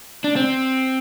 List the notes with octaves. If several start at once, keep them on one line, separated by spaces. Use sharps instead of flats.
D4
C4